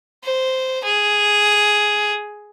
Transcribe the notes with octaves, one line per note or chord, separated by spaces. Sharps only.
C5
G#4